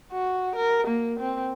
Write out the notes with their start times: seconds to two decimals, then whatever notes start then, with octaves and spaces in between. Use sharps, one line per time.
0.12 F#4
0.56 A#4
0.87 A#3
1.20 C4